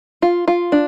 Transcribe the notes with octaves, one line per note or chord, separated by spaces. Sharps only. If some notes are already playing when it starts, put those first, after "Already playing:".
F4
F4
D4